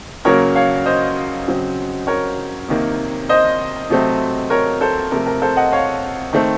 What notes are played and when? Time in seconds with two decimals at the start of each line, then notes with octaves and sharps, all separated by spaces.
0.25 C#3 F#3 A#3 A#4 C#5
0.55 C#5 F5
0.86 C5 D#5
1.47 C#3 F#3 C4
2.07 A#4 C#5
2.68 C3 D#3 A#3
3.29 C5 D#5
3.90 C3 F#3 A3 C4
4.50 A#4 C#5
4.81 A4 C5
5.11 C3 F3 A3 A#4
5.27 A#4
5.42 A4 C5
5.57 D#5 F#5
5.72 C#5 F5
6.33 D#3 A3 C4